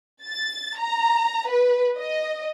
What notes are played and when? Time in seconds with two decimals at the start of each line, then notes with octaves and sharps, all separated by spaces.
0.24 A6
0.79 A#5
1.49 B4
1.98 D#5